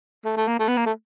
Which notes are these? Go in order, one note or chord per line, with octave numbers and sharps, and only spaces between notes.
A3
A3
A#3
A3
B3
A#3
A3